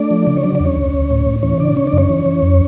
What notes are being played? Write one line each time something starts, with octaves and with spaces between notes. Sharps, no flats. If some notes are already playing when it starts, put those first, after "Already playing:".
Already playing: A3 D4 D5
F3
C#3
C#5
F#3 D4 D5
E2 D4 D5
C#4 C#5
D2
D2
A2
A2
E3 C#4 C#5
C#3 D4 D5
C#3 C#4 C#5
D4 D5
F#2
C#4 C#5
E3
E3
F2